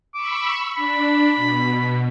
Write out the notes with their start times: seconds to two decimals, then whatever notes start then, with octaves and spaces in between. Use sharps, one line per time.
0.14 B5 C#6 D6 E6
0.76 D4 B5
1.36 B2